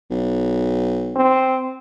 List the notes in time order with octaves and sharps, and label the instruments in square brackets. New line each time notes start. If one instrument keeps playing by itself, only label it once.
[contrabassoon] B1
[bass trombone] C4